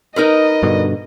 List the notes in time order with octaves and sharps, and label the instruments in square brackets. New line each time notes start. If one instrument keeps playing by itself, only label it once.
[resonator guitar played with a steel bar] D#4 A#4 B4 [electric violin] D#5
[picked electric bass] G2 B2 D3